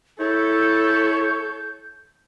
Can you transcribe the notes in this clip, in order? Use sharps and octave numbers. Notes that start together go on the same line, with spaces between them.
E4 A4 C#5 G6